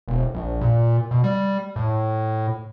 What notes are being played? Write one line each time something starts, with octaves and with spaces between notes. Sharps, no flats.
E1
A#1
A#2
B2
G3
A2